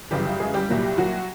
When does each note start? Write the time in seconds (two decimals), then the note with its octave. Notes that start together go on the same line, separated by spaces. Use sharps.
0.11 G1 F#2 C#3 E3 G3 G4
0.40 G#3 G#4
0.54 G3 G4
0.69 C2 A#2 F#3 A#3
0.98 F#3 F#4